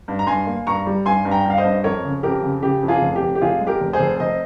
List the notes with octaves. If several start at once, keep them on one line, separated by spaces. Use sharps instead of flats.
G2
A#5
G2 G#5 C6
A#3
G2 A#5 C#6
G3
G2 G#5 C6
G2
G5 A#5
G2 F5
C5 D#5
G2
F2 A#4 C#5
C#3
F2 G4 A#4
C#3
C#3 G4
F2
F4 G#4
F1
G4
F1
G4
F1 F4 G#4
G#3
G4 A#4
F1
G#4 C5
F1
F1 C5 D#5